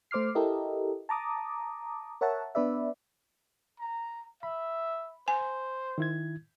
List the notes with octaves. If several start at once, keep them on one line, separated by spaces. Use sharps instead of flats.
A3 C5 D6 F6 C7
E4 G4 A4 A#4 D#5
A5 A#5 D6 D#6
A#4 C#5 E5 F#5 A5
B3 D4 B4 D5 E5
A#5
E5 B5
C5 G#5
D#3 E4 G#6